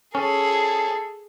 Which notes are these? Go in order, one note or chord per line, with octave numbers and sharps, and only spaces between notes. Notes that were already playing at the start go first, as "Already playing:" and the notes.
C#4 G#4 A4